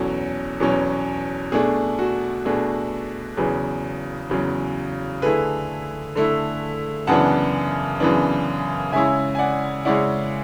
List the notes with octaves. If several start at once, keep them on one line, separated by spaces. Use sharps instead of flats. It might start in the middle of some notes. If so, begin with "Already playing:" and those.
Already playing: E2 B2 F#3 C#4 F#4 A4
E2 B2 F#3 C#4
B2 A3 D4 G#4
F#4
B2 A3 D4 G#4
E2 C#3 F#3 G#4 B4
E2 C#3 F#3
D3 A3 E4 G#4 B4
D3 A3 E4
F#2 C#3 E3 B3 D4 F#5 A5
F#2 C#3 E3 B3 D4
C#3 G#3 C#4 E4 E5 G#5
G#5
D5 F#5
C#3 G#3 C#4 E4 D5 F#5